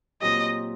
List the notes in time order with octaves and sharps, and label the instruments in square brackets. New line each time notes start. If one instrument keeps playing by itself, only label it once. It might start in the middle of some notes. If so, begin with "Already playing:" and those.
[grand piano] A#2 F#3 C4 G4 [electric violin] D#5